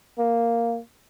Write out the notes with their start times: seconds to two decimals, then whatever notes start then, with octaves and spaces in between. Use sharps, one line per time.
0.18 A#3